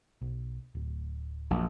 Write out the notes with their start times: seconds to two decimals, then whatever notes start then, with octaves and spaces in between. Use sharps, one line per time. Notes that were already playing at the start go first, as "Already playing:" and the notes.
0.21 B1
0.75 D1
1.51 A#1 F#2